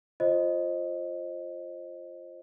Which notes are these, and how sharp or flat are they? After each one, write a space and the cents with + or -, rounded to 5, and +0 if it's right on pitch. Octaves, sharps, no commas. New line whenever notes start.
F4 +0 C5 +25 D#5 +0